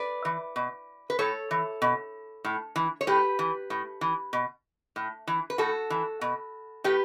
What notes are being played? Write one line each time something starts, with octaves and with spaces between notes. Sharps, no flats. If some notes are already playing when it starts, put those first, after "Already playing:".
Already playing: B4 D5
E3
B2
B4
A2 A4 C#5
E3
B2
A2
E3
C#5
A2 G4 B4
E3
A2
E3
B2
A2
E3
B4
A2 F#4 A4
E3
B2
A2 G4 B4